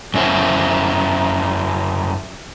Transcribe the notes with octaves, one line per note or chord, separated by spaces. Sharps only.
F#2 C#4 E4 C5